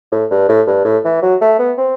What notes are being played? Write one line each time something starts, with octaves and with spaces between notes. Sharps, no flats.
A2
G2
A2
G2
A2
E3
F#3
A3
B3
C4